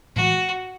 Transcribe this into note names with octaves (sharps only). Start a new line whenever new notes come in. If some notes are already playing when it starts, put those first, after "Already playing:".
A2 E3 G#3 F#4